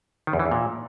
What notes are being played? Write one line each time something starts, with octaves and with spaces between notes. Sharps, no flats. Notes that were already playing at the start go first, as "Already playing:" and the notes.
D#3
E2
E3
E2
A#2